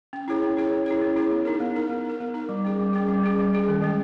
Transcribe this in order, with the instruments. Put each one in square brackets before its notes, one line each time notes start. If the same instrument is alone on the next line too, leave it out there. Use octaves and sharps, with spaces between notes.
[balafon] C#4
E4 G#4 C#5
C#4
E4 G#4 C#5
C#4
E4 G#4 C#5
C#4
E4 G#4 C#5
B3
D#4 A#4
B3
D#4 A#4
B3
D#4 A#4
B3
D#4 A#4
G3
C#4 G#4
G3
C#4 G#4
G3
C#4 G#4
G3
C#4 G#4
D#3
G#3 C#4